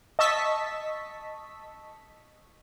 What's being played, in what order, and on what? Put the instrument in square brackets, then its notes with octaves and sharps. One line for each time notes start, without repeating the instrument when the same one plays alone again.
[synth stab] D#5 A5 C#6 E6 B6